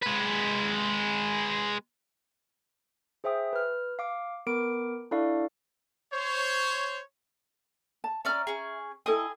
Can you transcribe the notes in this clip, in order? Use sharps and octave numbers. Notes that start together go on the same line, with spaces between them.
G#3 B4
G#4 C5 E5 G5 D#6
B4 F6
F5 D6
B3 A#4 B5 D6 D7
D4 E4 A4 D5 F5 C#6
C5 C#5
A5
C#4 D5 E5 A#5 F6
C#4 G#4
E4 G#4 A4 D#5 G5 D#6